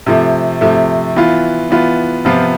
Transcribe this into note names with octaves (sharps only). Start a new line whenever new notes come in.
C3 F3 A3
C3 F3 A3
E3 B3 F4
E3 B3 F4
C3 F3 B3 F4